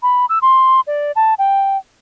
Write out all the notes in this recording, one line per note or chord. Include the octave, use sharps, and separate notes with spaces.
B5
E6
C6
D5
A5
G5